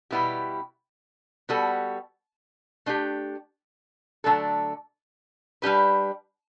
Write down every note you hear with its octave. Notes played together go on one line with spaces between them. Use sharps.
B2 G3 B3 E4 G4
G3 B3 F#4 A4
A3 D4 G4
D3 F#3 A3 D4 A4
G3 D4 G4 B4